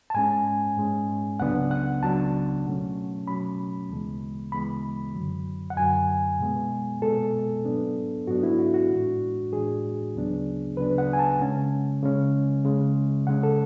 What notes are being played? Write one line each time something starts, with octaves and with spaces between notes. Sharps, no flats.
A5
G#2 G#3 C#4 G#5
G#2 G#3 C#4
C#2 C#3 F#3 B3 D4 F#5
F#5
C#2 C#3 F#3 B3 D4 A5
B2 F#3 A3 C#4
B2 F#3 A3 C#4 B5
D2 C#3 E3 G#3 B3
D2 C#3 E3 G#3 B3 B5
F#2 D3 F#3
F#5
F#2 D3 F#3 G#5
B2 G#3 B3
B2 G#3 B3 A4
G#2 F#3 B3 D4
G#2 F#3 B3 D4 F#4
E4
F#4
F#4
A2 E3 G#3 D4
A2 E3 G#3 D4 G#4
D2 C#3 F#3 B3 D4
D2 C#3 F#3 B3 D4 B4
F#5
G#5
A5
C#3 G#3 C#4
C#3 G#3 C#4
C#3 G#3 C#4
C#3 G#3 C#4 F#5
A4